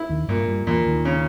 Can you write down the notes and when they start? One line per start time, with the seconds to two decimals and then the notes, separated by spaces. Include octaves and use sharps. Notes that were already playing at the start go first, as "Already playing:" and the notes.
Already playing: E4
0.09 D#2 D#3
0.28 G2 A#2 G3
0.48 G2 G3
0.67 E2 A#2 E3
0.86 D#2 D#3
1.05 C#3